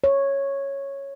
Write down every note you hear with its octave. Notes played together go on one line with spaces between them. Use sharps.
C#5